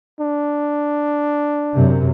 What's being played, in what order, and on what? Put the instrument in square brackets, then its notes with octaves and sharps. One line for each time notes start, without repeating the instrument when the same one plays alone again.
[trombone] D4
[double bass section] F#2 C3